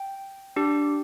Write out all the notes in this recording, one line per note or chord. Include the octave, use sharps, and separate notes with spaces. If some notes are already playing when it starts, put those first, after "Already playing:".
Already playing: G5
D4 G4